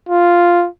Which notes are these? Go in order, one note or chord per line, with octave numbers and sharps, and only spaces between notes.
F4